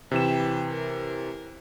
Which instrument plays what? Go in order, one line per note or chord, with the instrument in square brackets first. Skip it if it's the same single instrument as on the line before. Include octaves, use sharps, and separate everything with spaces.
[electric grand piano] C3 E3 E7 [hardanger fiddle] B4 G5
[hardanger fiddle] A#4